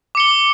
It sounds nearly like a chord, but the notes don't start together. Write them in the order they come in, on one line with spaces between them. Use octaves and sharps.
D6 C#7 G7